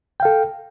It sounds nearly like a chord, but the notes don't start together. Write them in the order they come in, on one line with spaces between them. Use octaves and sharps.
G5 F5 A4